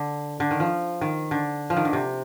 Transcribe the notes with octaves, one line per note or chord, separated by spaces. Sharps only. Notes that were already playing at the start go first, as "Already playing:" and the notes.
Already playing: D3
D3
D#3
F3
D#3
D3
F3
D#3
D3
C3